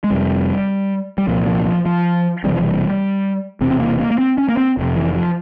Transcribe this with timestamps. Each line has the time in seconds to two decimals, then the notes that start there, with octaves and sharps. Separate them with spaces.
0.04 G#3
0.10 F1 F2 C3 G3
1.18 G3
1.27 C2 A#2 F3
1.47 F3
1.66 F3
1.86 F3
2.44 E1 E2 C3 G3
2.53 F3
2.62 G3
3.61 E1 E2 C3 C4
3.71 C4
3.80 A#3
4.00 A#3
4.11 A#3
4.18 C4
4.38 C#4
4.49 A#3
4.57 C4
4.77 F1 F2 C3
4.96 E3
5.16 F3